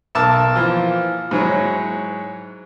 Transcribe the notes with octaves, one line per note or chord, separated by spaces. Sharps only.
B1 A#4 A5 D6 E6
E3 F3 A#3 F4
G#2 F#3 E4 C#5